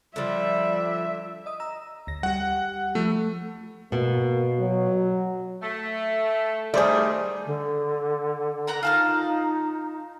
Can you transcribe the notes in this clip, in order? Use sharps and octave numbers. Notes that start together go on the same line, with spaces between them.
D3 F3 G3 E5
D#5 D#6
A#5 E6
D2 A#6
G3 G4 F#5
F3 A3
B2 A#3
F#3
A3
D#3 G3 A3 G#4 C5 D5 C6 D6
D3
A#4 F#5 A#5
D#4 F4 A5 F6